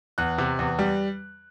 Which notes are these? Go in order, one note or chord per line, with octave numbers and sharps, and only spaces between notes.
E2 F#6
C3
E2
G3